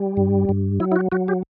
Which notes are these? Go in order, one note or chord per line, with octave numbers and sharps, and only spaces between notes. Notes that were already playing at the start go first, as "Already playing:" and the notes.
Already playing: G3
G2
G2
F#3 E4
E4
F#4
F#3 F#4
G4